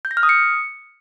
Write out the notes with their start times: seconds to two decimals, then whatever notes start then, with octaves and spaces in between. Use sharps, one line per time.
0.05 G6
0.11 A#6
0.17 F6
0.23 D#6
0.29 C#7